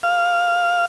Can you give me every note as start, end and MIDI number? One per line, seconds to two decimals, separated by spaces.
0.03 0.86 77